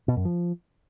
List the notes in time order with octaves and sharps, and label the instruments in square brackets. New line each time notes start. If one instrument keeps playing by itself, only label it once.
[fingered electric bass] B2
F#2
F3